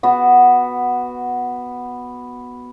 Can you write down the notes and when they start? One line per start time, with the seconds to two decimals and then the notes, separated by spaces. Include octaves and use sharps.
0.03 B3 F#4